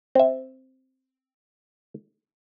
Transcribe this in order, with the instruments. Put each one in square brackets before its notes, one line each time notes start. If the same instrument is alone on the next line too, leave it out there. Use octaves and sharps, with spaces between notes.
[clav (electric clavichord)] C4 E5